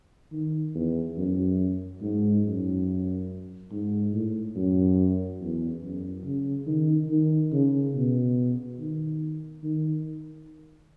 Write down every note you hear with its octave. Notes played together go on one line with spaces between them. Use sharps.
D#3
E2
F#2
G#2
F#2
G#2
A2
F#2
E2
F#2
C#3
D#3
D#3
C#3
B2
D#3
D#3